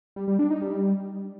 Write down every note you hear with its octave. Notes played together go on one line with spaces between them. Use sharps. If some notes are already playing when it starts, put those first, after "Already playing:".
G3
G3
D4
D#4
G3